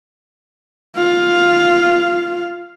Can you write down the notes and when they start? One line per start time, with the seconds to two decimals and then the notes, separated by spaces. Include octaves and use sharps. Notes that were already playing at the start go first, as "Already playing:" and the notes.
0.96 F4 F5